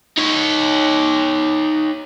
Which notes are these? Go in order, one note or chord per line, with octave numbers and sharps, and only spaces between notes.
D#4 C#5